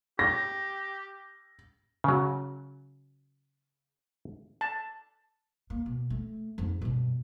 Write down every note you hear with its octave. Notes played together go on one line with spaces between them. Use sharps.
G4 A#6
C#3 F#3
A5
A#3
B2
A3
F2 G#2
G2 B2